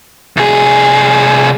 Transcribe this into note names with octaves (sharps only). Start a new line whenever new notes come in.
C2 G#4